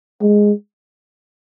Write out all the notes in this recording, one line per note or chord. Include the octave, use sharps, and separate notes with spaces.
G#3